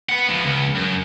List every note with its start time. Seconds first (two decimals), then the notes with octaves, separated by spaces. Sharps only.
0.09 B3 F#5
0.29 F3 B3
0.44 C#2
0.75 F#2